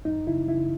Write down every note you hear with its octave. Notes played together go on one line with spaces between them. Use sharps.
F#2 D#4
C#3 E4
C#3 E4